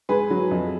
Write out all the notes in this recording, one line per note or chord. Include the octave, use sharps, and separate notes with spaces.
G#2 G#4 B4
F#3
F2